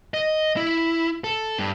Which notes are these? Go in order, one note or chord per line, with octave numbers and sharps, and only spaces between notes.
D#5
E4
A4
G2